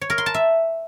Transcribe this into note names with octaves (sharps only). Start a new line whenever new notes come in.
C#5
A#4
C6
A5
E5